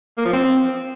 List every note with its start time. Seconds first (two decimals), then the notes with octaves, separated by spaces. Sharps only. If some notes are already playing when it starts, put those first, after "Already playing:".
0.18 A#3
0.26 F3
0.33 C4